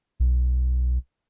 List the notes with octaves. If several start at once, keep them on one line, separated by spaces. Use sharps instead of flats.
B1